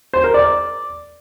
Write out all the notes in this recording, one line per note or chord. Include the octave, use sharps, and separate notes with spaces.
C5
A#4
D5